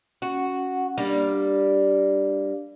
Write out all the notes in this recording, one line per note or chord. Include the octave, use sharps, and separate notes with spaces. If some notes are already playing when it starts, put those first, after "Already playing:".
C#4 F#4 F#5
G3 A#3 D4